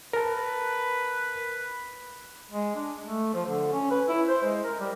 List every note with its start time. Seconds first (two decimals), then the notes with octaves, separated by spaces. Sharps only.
0.13 A#4 B4 A5
2.51 G#3
2.76 D4
3.03 A3
3.34 F3
3.46 D3
3.72 C#4
3.91 B4
4.08 E4
4.28 C5
4.43 G#3
4.64 A#4
4.80 G3